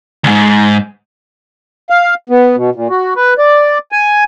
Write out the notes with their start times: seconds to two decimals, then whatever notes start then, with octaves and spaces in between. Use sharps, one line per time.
0.24 D2 G#2
1.90 F5
2.30 B3
2.56 B2
2.75 A#2
2.89 F#4
3.16 B4
3.38 D5
3.92 G#5